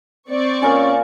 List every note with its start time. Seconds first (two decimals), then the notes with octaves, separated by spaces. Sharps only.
0.30 C4 D5 C#6
0.62 A#2 C#4 A#4 G#5